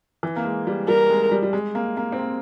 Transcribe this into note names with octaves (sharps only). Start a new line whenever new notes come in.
E3
A#3
G#3
G3
G3 A#4
G#3
G3
G3
G#3
A#3
A#3
C4
A#3